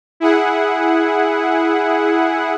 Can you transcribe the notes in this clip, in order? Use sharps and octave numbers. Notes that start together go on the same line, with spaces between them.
E4 G#4 F#5